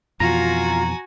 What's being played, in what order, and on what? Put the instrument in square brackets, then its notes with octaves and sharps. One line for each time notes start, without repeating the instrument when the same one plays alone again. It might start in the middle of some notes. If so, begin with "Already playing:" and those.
[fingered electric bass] F2 B2 E3 [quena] F4 [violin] F#4 G#5 [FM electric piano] A#5